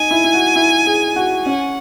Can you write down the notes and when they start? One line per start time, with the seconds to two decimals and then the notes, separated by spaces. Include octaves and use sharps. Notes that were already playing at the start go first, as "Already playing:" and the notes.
Already playing: D#4 G#5
0.11 E4
0.24 E4
0.34 F#4
0.56 E4
0.86 G#4
1.16 F#4
1.45 C#4 F#5